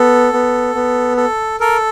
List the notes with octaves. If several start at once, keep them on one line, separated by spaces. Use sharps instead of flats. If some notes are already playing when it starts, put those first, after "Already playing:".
Already playing: B3 A4
B3
B3
A4
A4 A#4